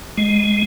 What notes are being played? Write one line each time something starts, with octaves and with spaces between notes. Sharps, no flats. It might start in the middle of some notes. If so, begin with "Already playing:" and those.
G#3